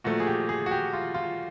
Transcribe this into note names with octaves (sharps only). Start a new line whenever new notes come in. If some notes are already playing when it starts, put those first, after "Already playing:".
A#2 F3 A3 F#4
G#4
G4
G#4
F#4
G4
F4
F4